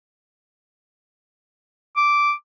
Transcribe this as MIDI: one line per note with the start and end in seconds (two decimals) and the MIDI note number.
1.96 2.32 86